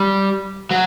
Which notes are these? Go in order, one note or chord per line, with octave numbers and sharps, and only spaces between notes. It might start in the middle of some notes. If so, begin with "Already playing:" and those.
Already playing: G3
F#3